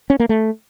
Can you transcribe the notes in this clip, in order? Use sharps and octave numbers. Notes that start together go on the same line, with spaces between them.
C#4
A#3
A3